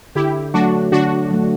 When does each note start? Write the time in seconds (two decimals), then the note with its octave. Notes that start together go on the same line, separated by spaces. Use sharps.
0.15 D3 E4 G4
0.54 F#3 A3 D4 F#4
0.92 D3 D4 F#4
1.30 F#3 A3